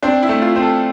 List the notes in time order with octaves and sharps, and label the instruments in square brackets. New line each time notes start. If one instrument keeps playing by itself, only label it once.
[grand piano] C4 [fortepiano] D4
[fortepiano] E4
[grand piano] A3
[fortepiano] F4
[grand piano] C4
[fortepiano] A4